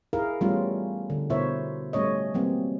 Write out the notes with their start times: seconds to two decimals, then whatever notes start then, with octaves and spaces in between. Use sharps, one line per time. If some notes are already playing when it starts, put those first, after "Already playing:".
0.13 E4 G#4 A#4 F5
0.41 E3 G3 A3 B3 C#4 F4
1.10 D3
1.30 B2 E4 A#4 C5 C#5 E5
1.93 G3 A3 C#4 C#5 D#5
2.34 E3 F#3 G3 A#3 C4